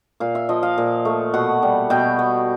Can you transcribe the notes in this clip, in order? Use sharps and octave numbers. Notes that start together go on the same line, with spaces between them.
A#2 F5
E5
F3 D#5
F5
A#2
A3
B2 F#5
G3
B2 G5
B3